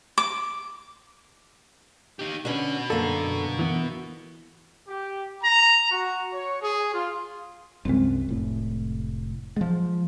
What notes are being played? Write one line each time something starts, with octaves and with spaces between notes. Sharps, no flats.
D6
D#4 G4
D3 C#4 F#4 B4
F#2 B2 D3 A#3 A4
E3 B3
G4
A#5
F#4
C#5
G#4
F4
C2 F#2 G#3 C4
F1 A2
F3 F#3 G#3